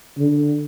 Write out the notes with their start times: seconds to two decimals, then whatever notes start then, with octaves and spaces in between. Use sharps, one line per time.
0.18 D3